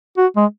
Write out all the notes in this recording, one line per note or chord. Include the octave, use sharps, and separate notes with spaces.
F#4
G#3